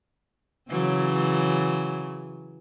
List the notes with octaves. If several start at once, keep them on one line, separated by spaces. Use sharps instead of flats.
C#3 E3 F#3